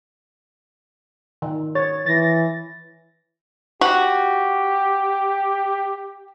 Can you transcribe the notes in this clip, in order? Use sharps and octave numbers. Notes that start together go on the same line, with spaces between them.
D#3
C#5 A6
E3 A6 A#6
F#4 G4